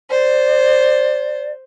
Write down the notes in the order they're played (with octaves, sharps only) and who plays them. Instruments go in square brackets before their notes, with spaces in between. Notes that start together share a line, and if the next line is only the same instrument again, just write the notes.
[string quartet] C5 [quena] D5